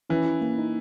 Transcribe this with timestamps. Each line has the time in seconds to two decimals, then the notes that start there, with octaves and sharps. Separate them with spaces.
0.10 E3 C#4
0.26 E4
0.41 A#3
0.58 D#4